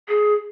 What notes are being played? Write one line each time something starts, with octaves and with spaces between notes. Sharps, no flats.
G#4